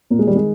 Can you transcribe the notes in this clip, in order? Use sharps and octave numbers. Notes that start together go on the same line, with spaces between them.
A#2 A#3
G#3
D#3 G3
G#3